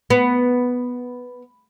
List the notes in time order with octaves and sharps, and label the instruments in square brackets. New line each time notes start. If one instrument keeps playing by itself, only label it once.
[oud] B3